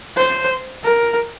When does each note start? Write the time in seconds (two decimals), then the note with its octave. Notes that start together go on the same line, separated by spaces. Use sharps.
0.17 C5
0.84 A#4